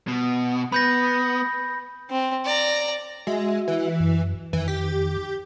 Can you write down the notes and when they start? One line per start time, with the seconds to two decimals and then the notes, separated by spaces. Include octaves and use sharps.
0.08 B2
0.72 B3 B5 G6 A#6
2.09 C4
2.45 D5 A#5
3.27 G#3 F#4 E5
3.68 E3
4.00 F#2
4.53 F2 D#3 E3
4.68 G4